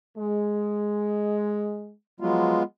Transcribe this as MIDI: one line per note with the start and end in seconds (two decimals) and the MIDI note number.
0.17 1.93 56
2.20 2.57 53
2.20 2.57 54
2.20 2.63 56
2.20 2.63 59
2.20 2.63 65